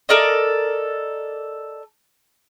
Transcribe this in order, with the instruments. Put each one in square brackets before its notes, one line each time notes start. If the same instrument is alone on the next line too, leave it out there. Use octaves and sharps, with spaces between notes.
[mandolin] A4 A#4 D5 D#5